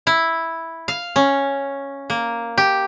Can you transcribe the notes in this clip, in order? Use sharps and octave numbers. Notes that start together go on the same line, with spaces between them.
E4
F5
C#4
A#3
G4